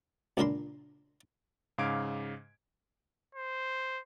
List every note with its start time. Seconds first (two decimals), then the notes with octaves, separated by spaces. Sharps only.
0.37 C#2 A#2 D4 A#4 B5 C6
1.78 G#2 C#3 F5 D6 G#6 D7
3.35 C5